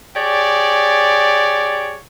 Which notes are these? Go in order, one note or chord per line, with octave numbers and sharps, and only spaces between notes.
G4 G#4 C#5 D5